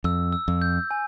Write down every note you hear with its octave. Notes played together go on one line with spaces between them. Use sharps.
F2 E6
E6
F2
G6
G#5